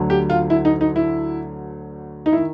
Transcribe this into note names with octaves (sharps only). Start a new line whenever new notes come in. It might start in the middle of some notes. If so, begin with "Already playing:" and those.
Already playing: D2 D3 F#3
G4
F4
E4
D#4
D#4
E4
D#4
E4
D#3